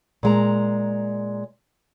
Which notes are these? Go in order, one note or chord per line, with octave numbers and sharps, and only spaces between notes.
A#2 G#3 A#5